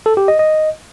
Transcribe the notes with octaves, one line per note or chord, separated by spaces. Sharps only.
A4
G4
D#5
D#5